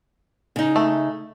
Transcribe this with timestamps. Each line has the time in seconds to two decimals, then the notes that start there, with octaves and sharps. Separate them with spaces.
0.56 C#3 D#4
0.76 A3